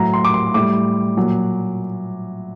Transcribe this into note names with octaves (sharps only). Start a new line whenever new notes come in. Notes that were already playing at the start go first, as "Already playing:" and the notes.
Already playing: A2 F#3 A#5
C6
D6
C6
A2 G3 D6
A#2 F#3